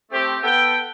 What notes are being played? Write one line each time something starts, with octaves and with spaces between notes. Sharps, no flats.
A3 C4 G4
B3 A4 G5